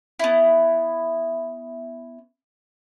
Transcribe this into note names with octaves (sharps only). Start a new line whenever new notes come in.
B3 E4